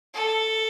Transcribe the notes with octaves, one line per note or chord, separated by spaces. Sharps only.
A4